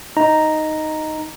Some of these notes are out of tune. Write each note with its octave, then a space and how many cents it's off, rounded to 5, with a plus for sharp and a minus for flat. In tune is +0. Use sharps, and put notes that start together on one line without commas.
D#4 +0 A#5 +0